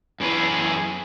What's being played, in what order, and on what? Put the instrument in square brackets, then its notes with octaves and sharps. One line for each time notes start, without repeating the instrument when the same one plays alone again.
[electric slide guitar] F#2 E3 G#4 B4